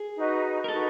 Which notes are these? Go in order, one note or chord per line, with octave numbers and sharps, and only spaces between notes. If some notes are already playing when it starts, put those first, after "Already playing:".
Already playing: G#4
D#4 F#4 B4 D#5
A#4
D#4 F#4 A4 B4 D#5